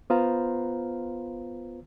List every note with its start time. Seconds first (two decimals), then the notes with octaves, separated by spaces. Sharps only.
0.10 B3 F4 B4 C5 F5 A#5